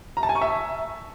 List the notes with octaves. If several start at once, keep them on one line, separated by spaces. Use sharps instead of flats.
A#5
A5
G#5
C#6
E5